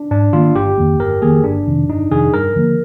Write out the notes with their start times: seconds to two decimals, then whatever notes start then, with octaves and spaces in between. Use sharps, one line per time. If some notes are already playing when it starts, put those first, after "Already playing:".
Already playing: D4
0.11 G#2 D4
0.33 D#3 A#3 D4 F4
0.55 G1 G4
0.78 F2 D#3 A#3
1.00 G1 A#4
1.22 F2 D#3 A#3 G#4
1.44 G1 D4
1.67 F2 C3 D#3
1.88 G1 D#4
2.11 F2 C3 D#3 G#4
2.34 G2 A#4
2.56 D3 F3 A#3